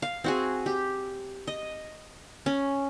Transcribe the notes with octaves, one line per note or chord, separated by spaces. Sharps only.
F5
C4 F#4 G#4
G4
D#5
C#4